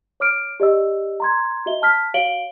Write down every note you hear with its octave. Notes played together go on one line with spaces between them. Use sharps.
C#5 D6 F6 D7
G4 D5 D#5 E6
A#5 C6 G#6
F#4 D#5 E5 G7
A5 F6 B6
F#4 C#5 F5 D7 F#7 G7